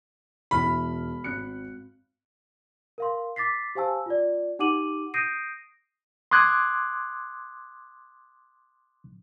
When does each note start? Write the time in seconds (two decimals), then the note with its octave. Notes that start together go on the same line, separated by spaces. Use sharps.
0.51 E1 E3 B5 F6
1.24 G#1 F#6 C#7
2.98 A#4 F5 C6
3.36 D6 A6 B6 C7
3.75 G4 C5 F5 G#5 A5 E6
4.06 F4 D5
4.59 D#4 G4 F#5 D6 D#7 F#7
5.14 D#6 G6 A#6 C7 D7 D#7
6.31 C6 D6 D#6 F#6 G#6